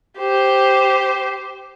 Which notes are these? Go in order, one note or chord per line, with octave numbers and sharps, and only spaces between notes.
G4 C5